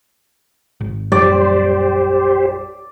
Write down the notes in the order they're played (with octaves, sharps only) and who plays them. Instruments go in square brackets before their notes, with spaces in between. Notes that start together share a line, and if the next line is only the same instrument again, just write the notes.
[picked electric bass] G#1
[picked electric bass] A#1 F#2 G3 [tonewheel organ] G4 C5 [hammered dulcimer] D5